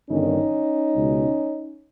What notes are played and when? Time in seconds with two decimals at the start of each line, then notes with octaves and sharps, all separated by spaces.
0.10 G1 G2 D#3 C#4 D#4
0.95 C#2 B2